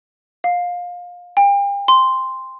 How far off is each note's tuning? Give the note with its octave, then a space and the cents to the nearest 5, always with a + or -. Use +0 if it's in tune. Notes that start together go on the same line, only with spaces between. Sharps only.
F5 +25
G5 +40
C6 -5